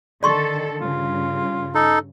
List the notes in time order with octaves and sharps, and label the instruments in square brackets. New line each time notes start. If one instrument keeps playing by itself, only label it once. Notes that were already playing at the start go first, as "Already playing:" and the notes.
[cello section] D3 D#3 A4 [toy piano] D5 C6 C#6
[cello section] G2 C#3 [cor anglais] F4
[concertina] D#4 A4